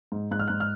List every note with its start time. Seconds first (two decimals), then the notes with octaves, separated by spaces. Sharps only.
0.12 G#2
0.31 G#2 F#6
0.39 F6
0.48 G#2 F#6
0.60 F6